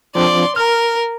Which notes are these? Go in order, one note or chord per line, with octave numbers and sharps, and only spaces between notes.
F3 C4 D4 D5 C6
A#4 F6